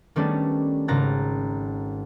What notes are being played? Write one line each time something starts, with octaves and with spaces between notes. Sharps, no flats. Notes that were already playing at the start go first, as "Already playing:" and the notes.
D#3 G3 A3 B3 C#4 D4
G#1 C#3 A#5 F#6 A6